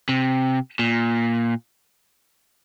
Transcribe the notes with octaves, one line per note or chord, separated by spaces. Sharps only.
C3
A#2